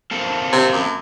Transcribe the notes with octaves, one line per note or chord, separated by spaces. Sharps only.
A#3 C4 A4
C3
F#2